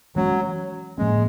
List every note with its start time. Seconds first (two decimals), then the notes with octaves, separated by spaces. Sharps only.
0.16 E3 F#3 G#3 C#4
0.98 A2 F3 G#3 A#3 C#4